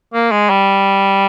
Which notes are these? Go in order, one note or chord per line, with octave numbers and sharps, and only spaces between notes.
A#3
G#3
G3